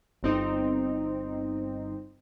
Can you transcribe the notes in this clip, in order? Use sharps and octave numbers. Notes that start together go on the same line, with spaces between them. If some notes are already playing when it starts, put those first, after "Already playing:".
G1 C4 D#4